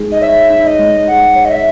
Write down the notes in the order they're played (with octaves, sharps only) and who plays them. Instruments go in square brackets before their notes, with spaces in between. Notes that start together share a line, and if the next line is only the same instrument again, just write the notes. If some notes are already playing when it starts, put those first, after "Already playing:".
Already playing: [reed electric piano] G#3 D#4 G#4
[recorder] D#5
[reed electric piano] C#5 [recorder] E5
[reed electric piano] D#4
[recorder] D#5
[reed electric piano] G#3
[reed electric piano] G#4 [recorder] F#5
[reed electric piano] C#5
[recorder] D#5
E5